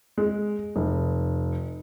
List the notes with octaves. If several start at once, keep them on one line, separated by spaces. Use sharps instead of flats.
G#3
F1